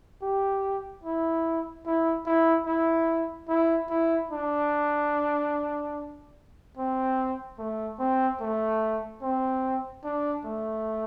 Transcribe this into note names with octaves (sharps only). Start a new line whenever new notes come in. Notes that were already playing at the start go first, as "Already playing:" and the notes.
G4
E4
E4
E4
E4
E4
E4
D4
C4
A3
C4
A3
C4
D4
A3